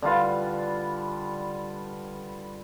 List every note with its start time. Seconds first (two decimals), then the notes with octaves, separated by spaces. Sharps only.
0.02 D3 G3 F4 B4